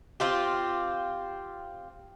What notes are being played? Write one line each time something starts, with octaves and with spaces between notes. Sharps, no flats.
C4 F4 G4